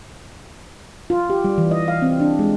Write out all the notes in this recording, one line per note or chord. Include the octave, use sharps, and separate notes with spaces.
F4
G4
G3
E3
D#5
F5
C4
D4
G#3